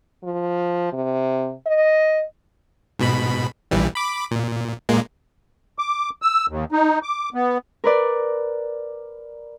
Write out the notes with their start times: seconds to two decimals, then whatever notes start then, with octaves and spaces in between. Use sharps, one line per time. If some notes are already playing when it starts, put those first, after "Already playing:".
0.24 F3
0.92 C3
1.66 D#5
2.99 G#2 B2 B5
3.71 A#1 E3 G3
3.95 B5 D6
4.31 A#2
4.89 A#2 G#3 A#3
5.79 D6
6.22 E6
6.49 D#2
6.72 D#4
7.03 D6
7.34 B3
7.84 A#4 B4 D5